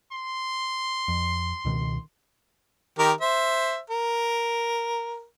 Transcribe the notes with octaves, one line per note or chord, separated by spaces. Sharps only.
C6
F2
C#2 B2 D#3
D#3 G4 A#4
C5 E5
A#4